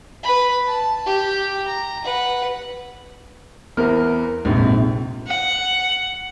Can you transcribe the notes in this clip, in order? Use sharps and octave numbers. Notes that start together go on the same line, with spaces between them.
B4 B5
A5
G4
A#5
B4 F#5
E2 E3 B3 A#4 C5 F6
A#1 F2 G#2 C3
F#5